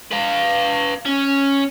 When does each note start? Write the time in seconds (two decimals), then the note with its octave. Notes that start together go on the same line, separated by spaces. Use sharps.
0.12 B4 F5
1.06 C#4